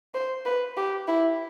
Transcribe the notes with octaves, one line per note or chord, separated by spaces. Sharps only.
C5
B4
G4
E4